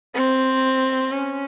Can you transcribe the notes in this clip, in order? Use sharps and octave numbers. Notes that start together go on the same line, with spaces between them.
C4
C#4